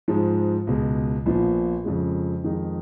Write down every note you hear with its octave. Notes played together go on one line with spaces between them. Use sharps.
G#2 F3 G#3
C#2 B2 G#3
A#1 A#2 F3 B3 F4
F2 C#3 F3 G#3
F2 D#3 G#3 D#4